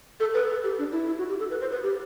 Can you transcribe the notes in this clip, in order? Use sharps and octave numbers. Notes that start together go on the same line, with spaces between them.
A4
B4
A4
G4
D4
E4
E4
F#4
G4
A4
B4
C5
B4
G4